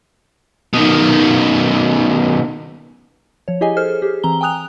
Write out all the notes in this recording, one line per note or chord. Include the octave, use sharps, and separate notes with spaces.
B2 D#3
F3 C#5
E4 G4 G#4 D#5 G#5
G#4 A4 C5 F6
G4 G#4
E3 C4 A#5 G7
G5 G#5 A#5 D#6 F#6 F7